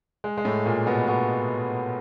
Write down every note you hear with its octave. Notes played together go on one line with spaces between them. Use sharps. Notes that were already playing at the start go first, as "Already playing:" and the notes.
G#3
G#3
A2 A3
A#2 A#3
B2 B3
B2 B3